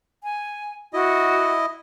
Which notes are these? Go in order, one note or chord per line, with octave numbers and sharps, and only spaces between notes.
G#5
E4 F#4 D#5